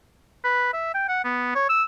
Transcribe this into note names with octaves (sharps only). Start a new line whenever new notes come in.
B4
E5
G5
F#5
B3
C#5
E6